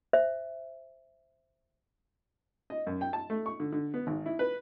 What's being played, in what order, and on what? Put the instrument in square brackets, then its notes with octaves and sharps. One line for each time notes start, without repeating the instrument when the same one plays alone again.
[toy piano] C5 E5
[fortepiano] D#5
F#2
G5
A5
A3
C#6
D3
D3
B3
G#1
E4
B4